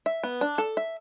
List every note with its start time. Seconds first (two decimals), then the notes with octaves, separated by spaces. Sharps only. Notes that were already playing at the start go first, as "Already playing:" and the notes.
0.06 E5
0.23 B3
0.41 D4
0.58 A4
0.77 E5